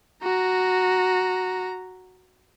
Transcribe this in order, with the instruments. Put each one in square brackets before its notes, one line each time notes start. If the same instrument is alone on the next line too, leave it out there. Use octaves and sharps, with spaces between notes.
[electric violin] F#4 A#5